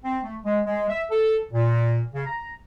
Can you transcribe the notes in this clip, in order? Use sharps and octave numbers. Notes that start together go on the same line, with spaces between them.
C4
A3
G#3
G#3
E5
A4
A#2
C#3
A#5